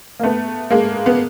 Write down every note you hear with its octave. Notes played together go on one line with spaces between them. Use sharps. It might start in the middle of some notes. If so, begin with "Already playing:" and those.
A#3
A3 B3
G#3 A#3
B3